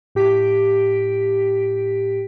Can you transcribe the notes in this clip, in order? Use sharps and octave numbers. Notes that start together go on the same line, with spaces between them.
A2 G4 B6 D7